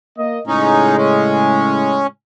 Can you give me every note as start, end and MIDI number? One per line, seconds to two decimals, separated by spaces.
0.18 0.40 58
0.18 0.40 75
0.47 2.08 45
0.47 2.08 49
0.47 2.08 56
0.47 0.97 61
0.47 0.97 63
0.97 2.07 61